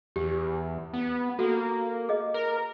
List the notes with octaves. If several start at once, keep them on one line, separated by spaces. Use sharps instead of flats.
E2 G4
B3
A#3 F#4 A4
G#4 D#5
A#4